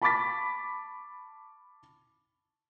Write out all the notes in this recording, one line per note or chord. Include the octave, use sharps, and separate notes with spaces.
A5 B5 C#6 D6 A6 B6